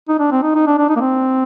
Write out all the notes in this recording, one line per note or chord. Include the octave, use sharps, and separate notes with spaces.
D#4
D4
C4
D#4
D#4
D4
D4
D#4
A#3
C4